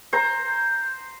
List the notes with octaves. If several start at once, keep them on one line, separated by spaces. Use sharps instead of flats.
C5 A#5